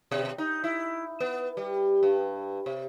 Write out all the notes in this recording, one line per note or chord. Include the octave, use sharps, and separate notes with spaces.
B2
D#4
E4
B3
G3
G2
C3